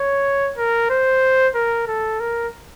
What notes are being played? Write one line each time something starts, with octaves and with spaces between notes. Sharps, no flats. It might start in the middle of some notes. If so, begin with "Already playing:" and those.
Already playing: C#5
A#4
C5
A#4
A4
A#4